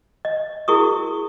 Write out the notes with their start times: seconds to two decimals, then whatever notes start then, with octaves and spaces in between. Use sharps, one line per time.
0.25 D#5
0.68 E4 F#4 G#4 A#4 C#6 D#6